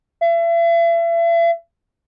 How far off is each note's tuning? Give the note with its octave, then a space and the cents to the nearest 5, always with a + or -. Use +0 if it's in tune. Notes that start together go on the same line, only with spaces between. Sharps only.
E5 +40